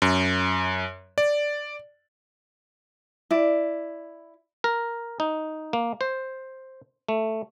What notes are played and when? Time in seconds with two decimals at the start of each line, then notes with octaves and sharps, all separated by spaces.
0.02 F#2
1.18 D5
3.30 E4 D5
4.64 A#4
5.20 D#4
5.73 A#3
6.01 C5
7.09 A3